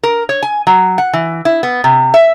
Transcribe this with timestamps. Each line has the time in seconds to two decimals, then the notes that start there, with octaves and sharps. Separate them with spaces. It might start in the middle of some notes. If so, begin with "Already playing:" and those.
0.03 A#4
0.29 C#5
0.43 G#5
0.67 F#3
0.98 F#5
1.13 E3
1.45 E4
1.63 B3
1.84 C3
2.14 E5